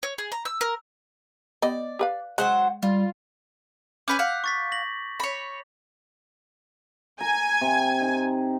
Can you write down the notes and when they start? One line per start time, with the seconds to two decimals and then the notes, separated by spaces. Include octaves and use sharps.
0.03 C#5
0.18 G#4
0.32 A#5
0.45 E6
0.61 A#4
1.62 B3 G4 D5 D#5
1.99 G4 B4 F5
2.38 F#3 G#3 C5 F#5
2.83 G3 F4
4.08 C#4 B4 G#5 D6 G6 B6
4.19 F5 F#5
4.44 C#6 A6 B6
4.72 A#6 F#7
5.20 C#5 B5
7.20 G#5 A#5
7.61 C3
8.01 D#4